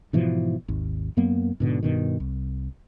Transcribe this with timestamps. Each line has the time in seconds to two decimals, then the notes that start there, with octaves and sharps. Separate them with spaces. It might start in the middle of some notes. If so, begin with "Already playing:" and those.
0.13 G#2 B2 E3 F3
0.68 G#1 D#2
1.17 F#2 F#3 A#3 B3
1.60 G#2 B2 D3
1.83 G2 B2 D#3
2.20 C2